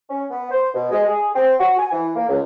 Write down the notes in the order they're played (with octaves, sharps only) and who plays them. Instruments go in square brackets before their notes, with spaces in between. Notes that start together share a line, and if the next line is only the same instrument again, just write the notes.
[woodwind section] C#4
B3
C5
B2
G#3
G#4
C4
F#4
G#5
E3
A#3
C#2